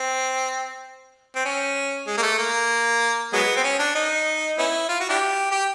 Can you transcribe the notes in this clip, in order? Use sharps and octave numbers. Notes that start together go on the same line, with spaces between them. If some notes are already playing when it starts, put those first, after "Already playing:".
Already playing: C4
C4
C#4
G#3
A#3
A3
A#3
F#3 G#3 B3
C4
C#4
D4
D#4
B3 C#4 E4
F4
F#4
D4 E4 G4
G4